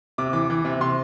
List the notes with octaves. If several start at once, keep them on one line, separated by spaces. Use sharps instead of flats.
C3 D6
E3 D6
E3
C3
C3 C6